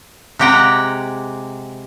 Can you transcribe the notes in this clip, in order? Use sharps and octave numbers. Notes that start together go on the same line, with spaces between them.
C3 G#3 G4 F#5 G5 A#5